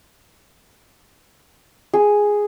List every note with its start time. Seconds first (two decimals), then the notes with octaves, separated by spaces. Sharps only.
1.94 G#4